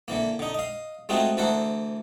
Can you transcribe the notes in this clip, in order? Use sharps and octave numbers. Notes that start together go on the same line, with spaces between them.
D3 E3 A#3
D3 D#4
D#5 F5
G#3 A3 C4 D#4 F4 F#4
D2 E3 A4 A#4 C5 F#5